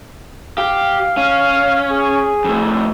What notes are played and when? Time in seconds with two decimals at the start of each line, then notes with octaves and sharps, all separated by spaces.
0.58 G4 F5
1.17 C#4 F5
1.91 G#4
2.44 F2 A2